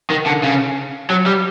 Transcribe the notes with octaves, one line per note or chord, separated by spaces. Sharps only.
D#3
D3
C#3
F#3
G3